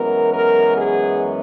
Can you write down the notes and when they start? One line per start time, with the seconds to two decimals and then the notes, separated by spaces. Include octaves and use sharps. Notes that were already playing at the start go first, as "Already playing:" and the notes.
Already playing: F#2 E3 G#3 B3 A#4
0.32 A#4
0.77 G#4